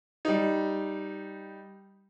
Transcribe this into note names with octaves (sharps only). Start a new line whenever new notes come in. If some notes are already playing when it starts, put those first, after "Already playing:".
G3 D#4